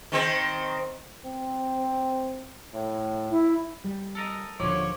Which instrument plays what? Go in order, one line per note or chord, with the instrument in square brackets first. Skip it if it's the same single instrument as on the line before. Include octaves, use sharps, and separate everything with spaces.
[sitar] D#3 C4 C5
[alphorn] C4
A2
[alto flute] E4
[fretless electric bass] G3
[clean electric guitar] A4 A#4 D#5
[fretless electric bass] D#1 D3 [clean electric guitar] D#2 F3 [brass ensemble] C#5 [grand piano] D6